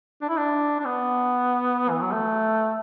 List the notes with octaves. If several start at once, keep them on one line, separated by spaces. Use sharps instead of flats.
D4
E4
D4
D4
B3
E3
F#3
A3